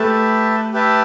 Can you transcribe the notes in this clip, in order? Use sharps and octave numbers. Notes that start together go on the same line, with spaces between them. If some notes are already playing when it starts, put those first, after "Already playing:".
Already playing: A3 G4 B4 E5 A5
G4 B4 E5 A5